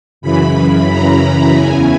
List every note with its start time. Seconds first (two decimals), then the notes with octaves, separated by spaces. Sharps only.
0.21 F#2 C#3 E3 B5
0.89 A#5
1.55 E2 C#3 E3 G#5